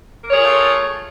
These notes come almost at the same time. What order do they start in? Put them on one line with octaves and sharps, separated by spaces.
A#4 C#5 G#4 F4 A3